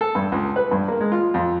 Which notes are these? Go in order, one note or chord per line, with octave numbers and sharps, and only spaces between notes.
A4
G2
C#2
B4
G2
A#3
G#3
F4
F2